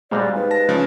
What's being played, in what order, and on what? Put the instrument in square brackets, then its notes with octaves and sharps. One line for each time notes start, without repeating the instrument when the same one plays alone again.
[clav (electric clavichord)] A#2 G3 F#4 [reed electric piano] G#3 C5 F5 [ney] D5
[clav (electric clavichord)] B3 D#4 G4 [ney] B4
[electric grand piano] A5 A#6
[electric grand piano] C#3 F3 [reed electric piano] G#3